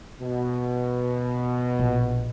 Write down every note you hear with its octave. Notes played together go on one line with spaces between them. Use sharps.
B2
A#1